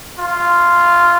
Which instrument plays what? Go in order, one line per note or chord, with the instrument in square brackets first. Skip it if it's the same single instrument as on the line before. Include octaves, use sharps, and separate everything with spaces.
[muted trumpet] F4